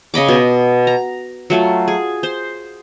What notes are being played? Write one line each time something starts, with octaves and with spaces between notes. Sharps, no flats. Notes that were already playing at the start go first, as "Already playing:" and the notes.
C#3 D#5 B5 D6
B2
A#5
F#3 A3 F4
G#4
C5